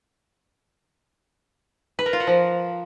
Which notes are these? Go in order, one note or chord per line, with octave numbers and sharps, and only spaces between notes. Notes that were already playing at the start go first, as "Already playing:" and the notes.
B4
A#4
F4
F#4
F3